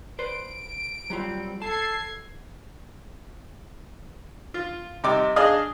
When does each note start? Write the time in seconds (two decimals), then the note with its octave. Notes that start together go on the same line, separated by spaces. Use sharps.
0.19 B4 C5 D5 D7
1.10 F#3 G3 C4 F4
1.62 A4 A5 G#6 C7
4.54 F4
5.04 C3 G3 D#4 D6
5.36 D4 G#4 D#5 F5